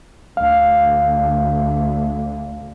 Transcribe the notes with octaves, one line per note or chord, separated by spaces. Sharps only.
D2 F5